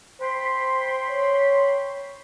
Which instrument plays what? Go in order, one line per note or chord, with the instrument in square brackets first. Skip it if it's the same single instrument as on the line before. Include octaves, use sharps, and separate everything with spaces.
[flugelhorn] C5 [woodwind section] G5 B5 C6
[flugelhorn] C#5